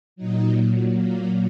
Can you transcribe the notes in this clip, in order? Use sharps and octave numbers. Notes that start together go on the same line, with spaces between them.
A#2 F#3 D#4
A#3